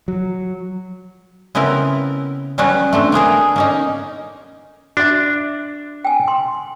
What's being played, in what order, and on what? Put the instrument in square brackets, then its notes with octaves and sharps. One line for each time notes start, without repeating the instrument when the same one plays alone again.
[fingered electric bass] F#3
[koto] C#3 B3 C4 E4 A#4
F#3 G3 B3 C#4 F#4
A3 C4 D4
A#3 B3 G#4 A#4
A#3 C#4 D#4
[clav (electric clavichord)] D4 [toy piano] F#4 E5
[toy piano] G5 G#5
C6